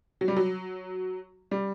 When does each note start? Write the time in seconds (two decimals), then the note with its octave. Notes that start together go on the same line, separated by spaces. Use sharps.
0.21 F#3
0.28 G3
0.36 F#3
1.51 G3